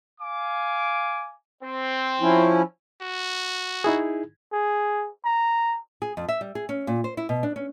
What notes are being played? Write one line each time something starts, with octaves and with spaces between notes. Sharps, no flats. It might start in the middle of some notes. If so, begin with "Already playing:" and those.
F5 G#5 D6
C4
F3 C#4 E4
F#4
D#4 E4 G#4
G#4
A#5
G#4
F2
E5
G3
G#4
C#4
A#2
C5
E4
B2
D4
C#4